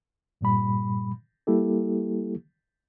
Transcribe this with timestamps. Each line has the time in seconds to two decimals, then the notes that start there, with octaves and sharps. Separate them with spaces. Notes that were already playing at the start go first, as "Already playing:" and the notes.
0.41 G2 A#2 G3 B5
1.47 G3 A#3 E4 G4 A4